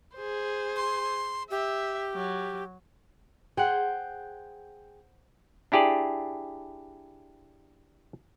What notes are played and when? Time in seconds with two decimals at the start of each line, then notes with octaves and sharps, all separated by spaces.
0.16 G#4 C5
0.76 C6
1.51 G4 E5
2.15 F#3
3.57 G#4 C5 F#5 G5
5.72 D4 E4 G4 G#4 D5